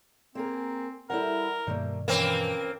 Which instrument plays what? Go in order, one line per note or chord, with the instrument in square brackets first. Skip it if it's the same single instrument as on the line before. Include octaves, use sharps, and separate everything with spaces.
[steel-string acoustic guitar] A#3 G#4 A#4 [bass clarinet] C4
[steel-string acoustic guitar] E3 G3 E4 [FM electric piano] A4 F#5 [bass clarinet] A#4
[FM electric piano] G2 B2 D#3 [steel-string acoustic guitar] G3 A3 A#3
[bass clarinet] E3 [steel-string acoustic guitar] F3 C#4 B4 [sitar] A#3 C4